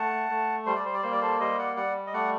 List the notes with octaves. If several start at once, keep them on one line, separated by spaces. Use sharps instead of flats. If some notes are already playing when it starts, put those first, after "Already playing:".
Already playing: A3 F#5 A5
A3
G3 C5
D5
C5
D5
A#3 C5
D5
A4 C5
G3 C5 D#5
D5 F#5
G3 D5 F#5
D#5
A3 D5 F#5